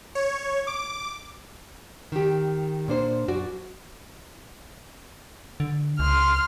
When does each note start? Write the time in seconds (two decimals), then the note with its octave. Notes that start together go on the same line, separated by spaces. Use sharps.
0.15 C#5
0.67 D6
2.12 D#3 G4
2.88 A#2 D4 C5
3.28 F#2 F#4 D5
5.60 D3
5.99 C#2 C6 F6